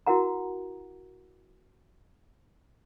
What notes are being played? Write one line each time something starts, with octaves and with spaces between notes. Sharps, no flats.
E4 F#4 A#4 F#5 A#5